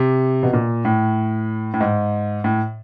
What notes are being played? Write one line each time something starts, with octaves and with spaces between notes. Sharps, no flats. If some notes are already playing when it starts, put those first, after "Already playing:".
Already playing: C3
B2
A#2
A2
A2
G#2
A2